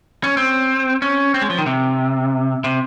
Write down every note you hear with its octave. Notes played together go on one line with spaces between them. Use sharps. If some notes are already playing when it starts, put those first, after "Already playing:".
C#4
C4
C#4
C4
G#3
F3
D#3
C3
C3